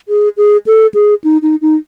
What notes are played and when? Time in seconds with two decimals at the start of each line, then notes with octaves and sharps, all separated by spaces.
0.09 G#4
0.37 G#4
0.67 A4
0.94 G#4
1.24 D#4
1.42 D#4
1.62 D#4